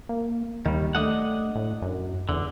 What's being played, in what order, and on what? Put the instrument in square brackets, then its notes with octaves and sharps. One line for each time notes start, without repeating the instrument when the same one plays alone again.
[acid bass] A#3
[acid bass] D#2 [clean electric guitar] D#3 G3
[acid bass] A3 [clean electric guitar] D4 D#5 F#5
[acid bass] A2
F#2
[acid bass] E2 [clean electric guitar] D3